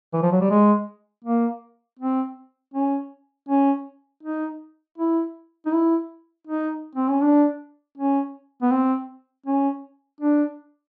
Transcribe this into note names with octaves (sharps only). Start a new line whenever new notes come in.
E3
F3
F#3
G3
G#3
A#3
C4
C#4
C#4
D#4
E4
D#4
E4
D#4
C4
C#4
D4
C#4
B3
C4
C#4
D4